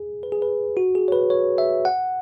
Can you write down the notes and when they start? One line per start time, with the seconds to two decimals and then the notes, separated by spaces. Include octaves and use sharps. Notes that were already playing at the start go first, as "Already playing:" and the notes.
Already playing: G#4
0.23 B4
0.32 G#4
0.42 B4
0.77 F#4
0.95 G#4
1.08 C#5
1.12 B4
1.30 C#5
1.58 E5
1.85 F#5